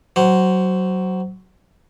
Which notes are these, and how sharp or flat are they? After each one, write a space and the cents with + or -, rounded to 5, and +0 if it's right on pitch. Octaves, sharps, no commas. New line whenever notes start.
F#3 +15 C5 +0